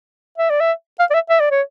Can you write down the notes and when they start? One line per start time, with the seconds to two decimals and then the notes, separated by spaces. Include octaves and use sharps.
0.38 E5
0.50 D5
0.60 E5
0.99 F5
1.10 D5
1.14 E5
1.29 E5
1.40 D5
1.51 C#5